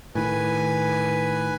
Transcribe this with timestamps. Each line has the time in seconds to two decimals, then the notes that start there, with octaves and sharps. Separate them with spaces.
0.15 A2 D#3 B4 G#5